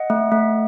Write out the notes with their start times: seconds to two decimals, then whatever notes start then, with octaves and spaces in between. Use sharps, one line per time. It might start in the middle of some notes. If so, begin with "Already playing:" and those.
Already playing: D#5 F#5
0.10 A3
0.32 A3